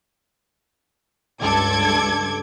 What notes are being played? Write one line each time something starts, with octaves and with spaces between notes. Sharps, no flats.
C#2 G2 A4 D6 G#6